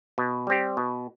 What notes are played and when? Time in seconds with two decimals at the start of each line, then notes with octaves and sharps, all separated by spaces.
0.18 B2
0.47 G3 C4 G4
0.77 B2